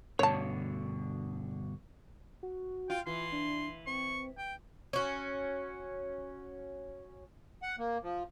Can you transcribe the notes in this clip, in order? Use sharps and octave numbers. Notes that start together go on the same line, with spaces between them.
G2 B2 D3 C#5 A5
F#4
F4 G5
E3 F4 C6
D4
C4 C#6
G5
C#4 F#4
F#5
A#3
F3